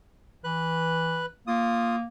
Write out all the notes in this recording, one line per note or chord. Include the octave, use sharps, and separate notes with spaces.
E3 B4 F#6
A#3 F4 D#6